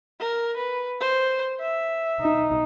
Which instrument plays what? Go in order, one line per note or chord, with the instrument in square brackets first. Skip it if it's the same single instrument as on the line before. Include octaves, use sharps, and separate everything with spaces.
[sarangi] A#4
B4
C5
E5
[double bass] D#4